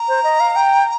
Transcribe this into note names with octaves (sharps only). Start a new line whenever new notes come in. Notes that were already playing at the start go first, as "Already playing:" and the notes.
Already playing: A#5
C5
D#5
F5
G5